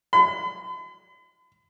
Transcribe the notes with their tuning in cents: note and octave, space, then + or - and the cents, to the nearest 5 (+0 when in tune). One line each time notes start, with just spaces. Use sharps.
B5 +45